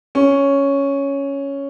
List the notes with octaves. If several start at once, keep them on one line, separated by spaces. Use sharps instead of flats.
C#4